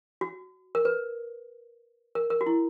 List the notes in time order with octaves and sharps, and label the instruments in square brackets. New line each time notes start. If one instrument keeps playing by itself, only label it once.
[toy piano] F#4
A#4
B4
A#4
A#4
F#4
E4